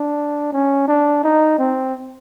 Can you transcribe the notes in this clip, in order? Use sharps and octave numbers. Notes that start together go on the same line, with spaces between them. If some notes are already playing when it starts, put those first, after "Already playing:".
Already playing: D4
C#4
D4
D#4
C4